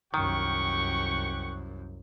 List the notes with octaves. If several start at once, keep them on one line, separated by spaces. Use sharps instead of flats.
C2 F#2 D#3 G4 F#5 C#6